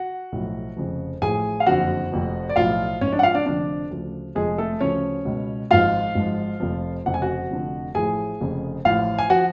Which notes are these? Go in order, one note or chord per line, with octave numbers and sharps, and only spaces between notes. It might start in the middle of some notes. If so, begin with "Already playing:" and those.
Already playing: F#4 F#5
B1 A2 F3
F1 F2 C#3 F3
A1 A2 F3 G#4 G#5
F5
F#1 F2 D3 F3 F#4 F#5
F1 F2 F3
D5
B1 A2 F3 F4 F5
G#1 G#2 F3 C#4 C#5
D4 D5
F#5
F4 F5
D4 D5
F1 F2 D3 F3 D4 D5
D2 C#3 F3
F1 F2 F3 G#3 G#4
A3 A4
D2 C#3 F3 C#4 C#5
C#2 B2
G#1 G#2 F3 F4 F5
G#1 G#2 F3
F1 F2 F3
F1 F2 C#3 F3 F#5
G#5
F#4 F#5
F1 F2 D3 F3
A1 A2 F3 G#4 G#5
F1 F2 C#3
A1 A2 F3 F4 F5
G#5
F3 F#4 F#5